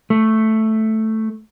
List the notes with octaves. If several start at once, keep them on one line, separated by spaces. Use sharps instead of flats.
A3